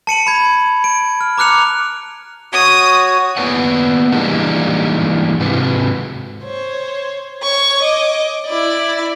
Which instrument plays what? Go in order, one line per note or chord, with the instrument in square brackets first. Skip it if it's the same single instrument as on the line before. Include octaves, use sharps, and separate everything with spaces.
[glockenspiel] A5 C#7 D#7 F#7
B5 G#6
D7
F6
A#5 D6 F6 F#6 C#7 F7
[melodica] F#4 C#5 [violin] D#6
[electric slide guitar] A#3 B3 B4 D5 F#5
E3 G3 G#3 A#3 D4 D#4
G#2 C3 C4 B4
[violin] C5 C#5
C#5 C#6
D#5 D6
E4 D5